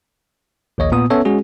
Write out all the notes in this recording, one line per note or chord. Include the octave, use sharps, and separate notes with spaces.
A#1 D#2 C#5 D#5
A#2 B3 D#6
B3 C#4 A4 C#5 E5
G#3 C#4 F#4 G#4